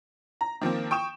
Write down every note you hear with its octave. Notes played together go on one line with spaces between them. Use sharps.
A#5
D#3 F3 A#3 C4
G5 C#6 D#6 E7